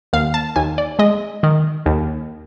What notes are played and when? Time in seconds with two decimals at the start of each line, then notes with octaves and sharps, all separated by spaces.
0.13 D#2 F5
0.34 A5
0.56 D#2 G#5
0.78 D5
0.99 G#3 D#5
1.43 D#3
1.86 D#2